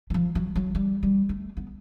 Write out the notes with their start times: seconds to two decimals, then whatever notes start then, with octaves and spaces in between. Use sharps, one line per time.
0.10 E3
0.14 F3
0.35 F#3
0.56 F#3
0.75 G3
1.03 G3
1.29 A3
1.57 B3